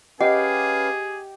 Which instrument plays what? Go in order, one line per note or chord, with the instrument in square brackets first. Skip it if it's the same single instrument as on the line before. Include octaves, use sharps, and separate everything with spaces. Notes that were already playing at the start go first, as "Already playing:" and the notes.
[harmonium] C#4 B4 F5 [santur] G4 [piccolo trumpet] G#4 [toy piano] D#5 F#5